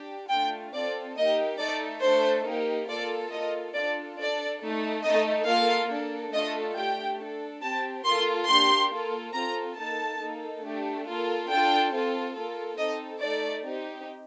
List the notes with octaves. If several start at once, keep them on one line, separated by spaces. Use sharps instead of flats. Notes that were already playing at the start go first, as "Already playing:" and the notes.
Already playing: D4 G4
A3 D4 F4 G5
C4 F4 A4 D5
A#3 D#4 G4 D#5
A3 D#4 A4 D5
A3 D4 A4 C5
A#3 D#4 G4
A#3 F4 A4 D5
A#3 F4 A4 D#5
D4 F4 A4 D5
D4 A4 D5
A3 D#4 A4
A3 D#4 A4 D#5
A#3 F4 A4 F5
A#3 D4 A4
A3 D4 F4 A4 D#5
A3 D4 G4 G5
D4 A4
C4 G4 A5
A#3 F4 A4 C6
A#3 D4 G4 C6
A#3 F4 A4
C4 F4 A4 A#5
A#3 D#4 A4 A5
A#3 D#4 A4
A3 D4 G4
A#3 F4 A4
D4 F4 A4 G5
C4 F4 A4
A#3 F4 A4
C4 D#4 A4 D#5
A3 D#4 A4 D5
C4 D#4 G4